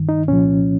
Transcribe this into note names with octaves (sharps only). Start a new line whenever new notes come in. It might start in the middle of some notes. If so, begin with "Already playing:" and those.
Already playing: G2 D#3
D#4
C2 A#2 F3 C#4